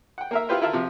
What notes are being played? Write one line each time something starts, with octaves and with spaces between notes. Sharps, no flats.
F#5 G5
A#3 A#4 E5
E4 F4 G4 B4 C5
E4 F4 A#4 E5 A5
C3 F3